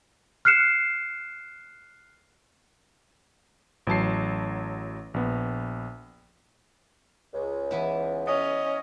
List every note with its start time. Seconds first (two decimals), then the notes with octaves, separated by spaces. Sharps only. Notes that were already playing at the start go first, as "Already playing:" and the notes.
0.45 F6 F#6 C7 C#7 E7
3.87 A1 F#3 A5 C7
5.14 A#1 B3
7.33 C#2
7.71 E3 B3 E4
8.27 C#4 D#5